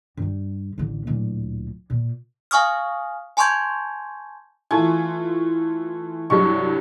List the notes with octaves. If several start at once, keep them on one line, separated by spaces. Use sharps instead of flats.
G2 G3
A1 D3
D1 A#2
A#2
F5 G#5 C#6 D#6 F6
G#5 A5 C6 C#6 G6 G#6
E3 A3 F4 G#5
C2 G2 F#3 C#6